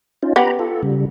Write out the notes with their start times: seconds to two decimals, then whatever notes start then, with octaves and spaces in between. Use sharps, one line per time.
0.23 C#4 D#4 F4
0.36 B3 G4 A#5 B5
0.59 F4 A4
0.83 C#3 G3